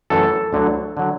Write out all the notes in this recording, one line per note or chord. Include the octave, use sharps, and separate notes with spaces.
F#2 E3 A3 A4
D2 D3 F#3
D3 F#3